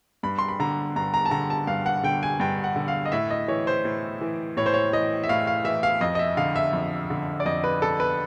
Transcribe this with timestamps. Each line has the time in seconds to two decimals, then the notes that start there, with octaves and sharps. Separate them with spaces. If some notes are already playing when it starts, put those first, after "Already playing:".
0.23 G2 B5
0.39 C6
0.48 B5
0.60 D3 A#5
0.96 G2 A#5
1.14 A#5
1.25 A5
1.31 D3 A#5
1.50 A5
1.67 G2 F5
1.86 F#5
2.03 D3 G5
2.23 G#5
2.40 G2 G5
2.64 F#5
2.76 D3
2.88 F5
3.06 D#5
3.12 A2 E5
3.31 D#5
3.48 E3 C#5
3.67 C5
3.85 A2
4.21 E3
4.57 A2 C#5
4.66 C5
4.74 C#5
4.93 E3 D#5
5.24 E5
5.29 A2 F5
5.47 F5
5.65 E3 E5
5.83 F5
6.01 F2 D#5
6.15 D#5
6.19 E5
6.37 D3 F5
6.56 E5
6.73 F2
7.10 D3
7.40 D5
7.46 F2 D#5
7.64 B4
7.82 D3 A4
8.00 B4